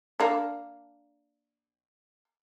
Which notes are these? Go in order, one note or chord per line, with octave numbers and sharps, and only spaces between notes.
A#3 D4